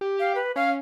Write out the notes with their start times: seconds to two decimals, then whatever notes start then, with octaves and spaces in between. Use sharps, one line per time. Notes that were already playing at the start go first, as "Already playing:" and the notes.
0.01 G4
0.20 F5
0.35 B4
0.56 C#4 F5